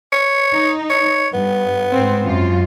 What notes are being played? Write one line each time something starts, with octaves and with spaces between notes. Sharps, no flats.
C#5
D#4
C#5
G2 B3
G#2 C4
F#2 F4